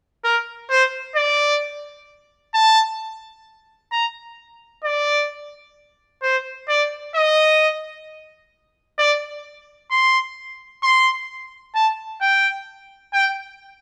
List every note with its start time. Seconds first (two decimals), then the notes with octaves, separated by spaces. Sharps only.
0.24 A#4
0.70 C5
1.16 D5
2.54 A5
3.92 A#5
4.84 D5
6.23 C5
6.69 D5
7.15 D#5
8.98 D5
9.91 C6
10.83 C6
11.75 A5
12.21 G5
13.13 G5